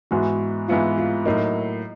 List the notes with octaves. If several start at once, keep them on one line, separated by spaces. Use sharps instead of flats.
G#2 E3 G#3 B3 E4 F#4
G#2 E3 G#3 B3 E4 F4
F4
A2 F#3 A#3 D#4